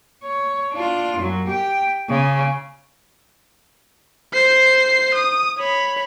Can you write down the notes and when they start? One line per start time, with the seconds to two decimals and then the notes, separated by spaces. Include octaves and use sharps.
0.23 C#5
0.73 D4 F4
1.17 F#2 F#3
1.47 G4 G5
2.09 C#3
4.33 C5 C7
5.14 D#6
5.58 C#5 B5